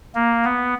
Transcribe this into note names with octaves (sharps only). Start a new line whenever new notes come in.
A#3
B3